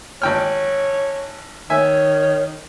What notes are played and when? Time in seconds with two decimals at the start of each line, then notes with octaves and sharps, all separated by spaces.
0.22 G#1 C#5 G5 F6
1.70 D#3 C#5 E5 G#5